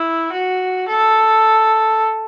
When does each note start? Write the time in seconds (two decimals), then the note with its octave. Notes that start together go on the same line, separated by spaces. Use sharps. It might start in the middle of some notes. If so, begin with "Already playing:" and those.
Already playing: E4
0.32 F#4
0.88 A4